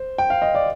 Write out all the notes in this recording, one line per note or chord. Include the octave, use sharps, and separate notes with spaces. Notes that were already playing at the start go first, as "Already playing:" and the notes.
Already playing: C5
G5
F5
D#5
D5